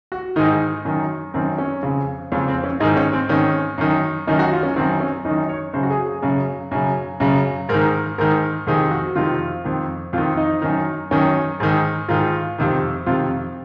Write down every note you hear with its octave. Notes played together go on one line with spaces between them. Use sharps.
F#4
G#2 D#3 D#4
F#2 D#3
F#2 D#3 C4
C#4
F2 C#3
F2 C#3 C#4
C4
C#4
G#2 D#3 D#4
C#4
C4
G#2 D#3 C#4
F#2 D#3
F#2 D#3 D#4
F#4
F4
C#4
F#2 D#3 C4
C#4
F#2 D#3 D#4
C#5
F#2 C#3 C5
F#4
G#4
G#4
F#2 C#3
F#2 C#3
F#2 C#3
G#2 D#3 A#4
G#2 D#3 A#4
F2 C3 D#3 G#4
F#4
F2 C3 D#3 F4
F2 D#3
F2 D#3 F4
D#4
F#2 D#3
F#2 D#3 C#4
G#2 D#3
G#2 D#3 F4
F2 C3 D#3
F2 C3 D#3 F4